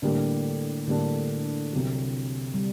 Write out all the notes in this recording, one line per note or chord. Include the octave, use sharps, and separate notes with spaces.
A2 D3 G3 A#3 D4
A2 D3 G3 A#3 D4
C2 C3 F#3
G3